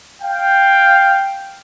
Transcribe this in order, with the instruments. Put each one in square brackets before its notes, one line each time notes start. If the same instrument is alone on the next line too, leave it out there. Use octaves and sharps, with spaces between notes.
[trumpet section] F5 G5